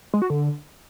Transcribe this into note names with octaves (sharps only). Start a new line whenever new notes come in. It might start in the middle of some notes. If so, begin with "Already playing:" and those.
G#3
F#4
D3